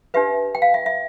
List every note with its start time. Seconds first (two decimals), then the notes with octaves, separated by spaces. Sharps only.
0.14 D4 G4 B4 E5
0.55 G5
0.62 F5
0.74 E5
0.86 E5